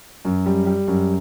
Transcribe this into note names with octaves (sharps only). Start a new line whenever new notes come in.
F#2
G3
G3
F#2